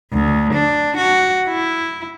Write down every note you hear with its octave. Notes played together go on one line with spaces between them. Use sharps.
D2
D4
F#4
E4